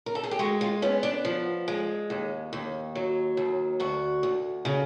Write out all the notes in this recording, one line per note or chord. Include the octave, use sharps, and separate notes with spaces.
A#4
A4
G#4
G4
G#3 F#4
F4
B3 C#4
D4
F3
G#3
D#2
D#2
F#3
D#2
D2 F#4
D2
C#3